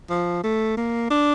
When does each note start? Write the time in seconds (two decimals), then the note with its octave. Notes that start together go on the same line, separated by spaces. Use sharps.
0.10 F3
0.43 A3
0.77 A#3
1.10 D4